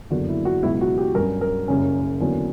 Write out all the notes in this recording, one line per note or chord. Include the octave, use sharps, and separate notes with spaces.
F#1 E2 D3 A#3 F#4
E4
F#4
C#2 B2 F#3 E4
F#4
G4
G2 F#3 C#4 A#4
A#4
F#1 F#2 C#3 G3 C#4
E2 D3 F#3 A#3 C#4